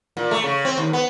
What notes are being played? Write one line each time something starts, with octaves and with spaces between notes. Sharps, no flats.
A#2
A3
C#3
C4
D#2
B3